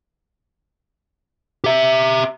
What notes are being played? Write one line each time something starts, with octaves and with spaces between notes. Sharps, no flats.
G4 E5